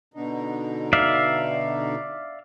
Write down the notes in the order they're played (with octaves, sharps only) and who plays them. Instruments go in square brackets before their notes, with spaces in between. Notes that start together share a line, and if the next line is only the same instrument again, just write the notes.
[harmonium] B2 D3 D#4
[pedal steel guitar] D5 E5 F5